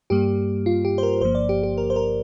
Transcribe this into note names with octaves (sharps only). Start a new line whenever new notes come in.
G2 G3 A#3 G4
F4
G4
C5
A#4
G1 G2 F3 A#3 C5
D5
G4
G4
A#4
C5
A#4